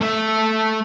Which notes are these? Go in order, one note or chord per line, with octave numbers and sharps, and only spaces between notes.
A3 E5